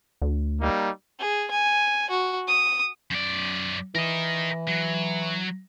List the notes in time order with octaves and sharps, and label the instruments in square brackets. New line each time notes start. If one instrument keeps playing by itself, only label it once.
[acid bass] D2
[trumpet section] G3 A#3 D#4
[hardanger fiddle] G#4
G#5
F#4
D#6
[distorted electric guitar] F#2 D5
[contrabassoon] E3 [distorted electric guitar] A#4 D#5
[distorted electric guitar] F#3